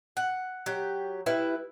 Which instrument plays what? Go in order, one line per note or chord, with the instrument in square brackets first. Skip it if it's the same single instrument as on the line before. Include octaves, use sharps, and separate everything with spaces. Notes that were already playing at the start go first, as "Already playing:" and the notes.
[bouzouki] F#5
F#3 G4
G3 E4 B4